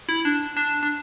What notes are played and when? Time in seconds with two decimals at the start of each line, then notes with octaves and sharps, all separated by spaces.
0.09 E4
0.25 D4
0.57 D4
0.83 D4